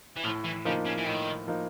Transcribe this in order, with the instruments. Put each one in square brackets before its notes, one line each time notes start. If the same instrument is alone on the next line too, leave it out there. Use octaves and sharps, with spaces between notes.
[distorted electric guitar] E3
[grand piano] A2 [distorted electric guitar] F3
[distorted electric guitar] E3
[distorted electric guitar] C#3 [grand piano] F3 A#3 D#4
[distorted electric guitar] C#3
E3
[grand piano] A2 [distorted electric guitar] D#3
[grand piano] F3 A#3 D#4